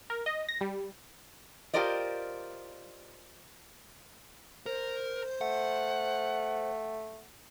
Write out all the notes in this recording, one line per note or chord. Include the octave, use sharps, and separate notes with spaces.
A#4
D#5
A#6
G3
F4 G4 A#4 C5 D5 D#5
A#4 C5
A3 F#5